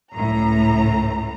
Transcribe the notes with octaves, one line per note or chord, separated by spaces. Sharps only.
C#2 A2 A#5